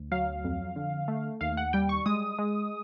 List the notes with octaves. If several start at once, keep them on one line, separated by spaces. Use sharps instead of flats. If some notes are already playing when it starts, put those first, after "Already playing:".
Already playing: D2
F#3 F5
F2
D3
A3
D#2 F5
F#5
G3 G5
C#6
G#3 D#6
G#3